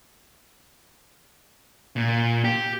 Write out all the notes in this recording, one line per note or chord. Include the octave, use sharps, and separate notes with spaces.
A#2
G4